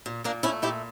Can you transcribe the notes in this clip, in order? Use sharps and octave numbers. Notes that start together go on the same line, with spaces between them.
A#2
A#2 A#3 D4
A3 C#4 E4
A#2 E4 G4